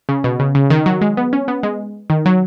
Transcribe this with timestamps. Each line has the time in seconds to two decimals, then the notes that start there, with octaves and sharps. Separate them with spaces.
0.09 C#3
0.24 B2
0.40 C#3
0.55 C#3
0.70 D#3
0.86 F#3
1.01 G#3
1.17 B3
1.33 C#4
1.48 B3
1.63 G#3
2.10 D#3
2.26 F#3